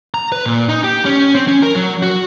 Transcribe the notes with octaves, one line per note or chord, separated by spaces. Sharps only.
A#5
B4
A#2
D#4
G4
C#4
C4
C#4
A#4
F#3
F#4